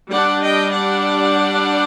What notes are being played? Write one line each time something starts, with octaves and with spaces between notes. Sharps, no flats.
G3 D4 D5 F#5
D#5 G5
D5 F#5